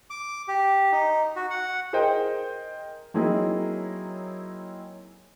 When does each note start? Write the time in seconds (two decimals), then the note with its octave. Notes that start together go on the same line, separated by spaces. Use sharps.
0.10 D6
0.48 G4
0.92 D#4
1.36 F#4
1.50 F#5
1.93 G#4 A#4 C5 D#5 G5
3.14 F#3 A#3 C4 D#4 E4 G#4